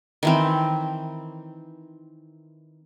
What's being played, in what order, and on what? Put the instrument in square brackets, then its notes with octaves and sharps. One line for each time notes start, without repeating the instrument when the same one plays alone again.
[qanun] D#3 E3 C4